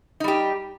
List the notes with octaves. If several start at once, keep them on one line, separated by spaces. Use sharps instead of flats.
G3 D#4 G4